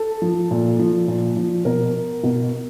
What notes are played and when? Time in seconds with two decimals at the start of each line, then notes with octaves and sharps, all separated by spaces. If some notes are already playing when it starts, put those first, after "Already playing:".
Already playing: A4
0.22 F3
0.51 A#2
0.79 F3
1.08 A#2
1.37 F3
1.65 B2 A#4
2.23 B2